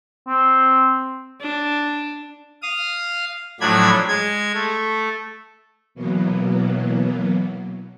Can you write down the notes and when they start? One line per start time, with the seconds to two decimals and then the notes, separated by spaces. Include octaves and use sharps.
0.27 C4
1.42 D4
2.62 F5 D#6
3.60 A2 F3 F#3 D4 B5 G#6
4.08 G#3 G#6
4.54 A3
5.95 B2 E3 F#3 A#3 B3